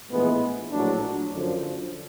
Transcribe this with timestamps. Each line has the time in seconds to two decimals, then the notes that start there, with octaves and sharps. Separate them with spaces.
0.10 A#1 A2 E3 G#3 B3
0.71 A#1 A2 F#3 A3 D4
1.32 F#2 D3 F3